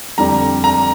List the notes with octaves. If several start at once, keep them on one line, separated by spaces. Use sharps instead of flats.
F2 D3 G3 D4 A#5
A#5